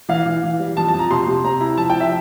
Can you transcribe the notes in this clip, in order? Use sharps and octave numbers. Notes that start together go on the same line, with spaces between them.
E3 F5
E3
E3
G3
F2 A5
A5
F2
A#5
C3 C6
C3
C4 A#5
E4 A#5
F3 A5
G5
F3
E5